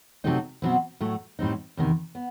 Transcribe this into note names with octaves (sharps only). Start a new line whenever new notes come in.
C3 F#3 A3 C4 D#4
B2 F#3 C4 E4
A2 F#3 A3
A2 G3 C4 D#4
E2 C3 D#3
B3